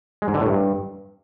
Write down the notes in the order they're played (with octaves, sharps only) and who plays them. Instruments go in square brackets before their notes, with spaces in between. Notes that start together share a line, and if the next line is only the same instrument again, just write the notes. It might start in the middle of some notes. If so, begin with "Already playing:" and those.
[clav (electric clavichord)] G#3
G#2
D3
A2
G2